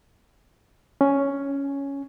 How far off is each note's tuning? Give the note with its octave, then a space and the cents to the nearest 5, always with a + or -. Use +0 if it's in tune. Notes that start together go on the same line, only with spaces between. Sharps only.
C#4 +5